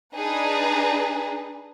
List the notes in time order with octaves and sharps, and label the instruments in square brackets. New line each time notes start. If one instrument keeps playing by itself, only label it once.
[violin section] D4 D#4 G#4 B4